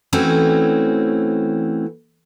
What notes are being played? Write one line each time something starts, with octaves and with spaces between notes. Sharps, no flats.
E3 A3 C4 C#4 F#4